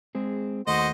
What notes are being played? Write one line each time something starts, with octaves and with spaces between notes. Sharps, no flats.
G#3 C4 G#4
D#2 A3 F#4 C5 D#5